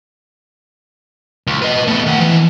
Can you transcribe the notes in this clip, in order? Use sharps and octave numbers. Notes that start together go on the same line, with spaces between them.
C#2
B4 D#5
A3 B3
D#3 F#5
E3